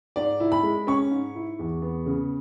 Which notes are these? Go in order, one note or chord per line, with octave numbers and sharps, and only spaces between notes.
G#2 D5
E4
B5
G#3
C#4 C#6
G#2
E4
E2
B3
C#3